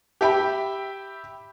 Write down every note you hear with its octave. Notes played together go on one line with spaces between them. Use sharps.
G4 E5 G5 B5